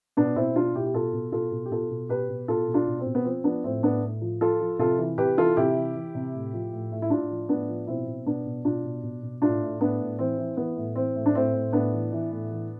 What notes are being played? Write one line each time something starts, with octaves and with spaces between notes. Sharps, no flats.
B2 B3 D4
B2 C4 E4
B2 D4 F4
B2 E4 G4
G4
B2 F4 A4
B2
B2 F4 A4
B2
G4
B2 F4 A4
B2
B2 G4 B4
B2
B2 F4 A4
B2
D4 F4
B2
C4
B2
B3
F3 C4
F3 B3 D4
A2 C4
A2 B3 D4
A2
F3
F3 F4 A4
F3
C3 F4 A4
E3
C3 G4 B4
E3 F4 A4
C3 E4 G4
E3
E3
C3
A2
F3
A2
A2
E4
A2 D4 F4
F3
A2 B3 D4
F3
B2 C4 E4
B2
B2 B3 D4
B2
B2 D4 F4
B2
B2
B2
A2 D4 F4
A2
A2 B3 D4
A2
E3 C4
E3
E3 B3
A2
E3 C4
A2
D4
A2 C4
A2
A2 B3 D4
E3
E3
A2
E3